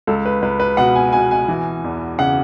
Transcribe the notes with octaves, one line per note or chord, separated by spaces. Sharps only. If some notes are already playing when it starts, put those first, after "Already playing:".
C#2 A4
B4
C#2 B4
B4
B2 F#5
G#5
B2 G#5
G#5
E3
E2
C#3 F#5